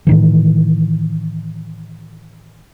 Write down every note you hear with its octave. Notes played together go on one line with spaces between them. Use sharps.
A2 D#3 E3